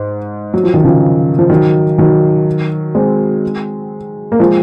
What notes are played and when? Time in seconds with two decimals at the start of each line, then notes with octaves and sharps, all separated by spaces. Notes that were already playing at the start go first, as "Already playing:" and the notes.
Already playing: G#2
0.54 F#3
0.63 F3
0.74 D#3
0.84 C#3 F3
1.39 F3
1.50 D#3 F#3
1.98 D#3 F#3
2.95 G#3 C4
4.32 A#3
4.39 F3 G#3